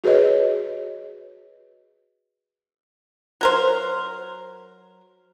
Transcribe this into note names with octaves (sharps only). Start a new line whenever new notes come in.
F#4 G#4 B4 C#5 D#5
F#3 A#4 C5